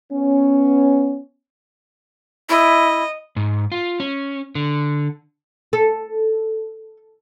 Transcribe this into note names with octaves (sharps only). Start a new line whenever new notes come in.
B3 C#4
E4 D#5
G#2
F4
C#4
D3
A4